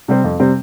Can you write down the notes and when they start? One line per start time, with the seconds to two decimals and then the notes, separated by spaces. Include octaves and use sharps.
0.08 C3 G3 C4
0.24 F2
0.39 C3 G3 C4